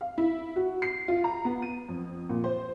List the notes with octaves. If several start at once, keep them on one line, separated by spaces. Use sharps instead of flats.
F5
E4
F#4
C7
F4
A#5
B3
D#7
F2
A#2
C5